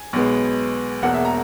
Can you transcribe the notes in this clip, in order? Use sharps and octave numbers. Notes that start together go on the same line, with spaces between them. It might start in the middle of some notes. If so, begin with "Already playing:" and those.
Already playing: G#5
B1 B2 G#3 B3
E1 E2 B2 A#3 F#5
E5
A#5